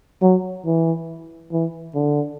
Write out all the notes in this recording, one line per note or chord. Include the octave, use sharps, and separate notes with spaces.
F#3
E3
E3
D3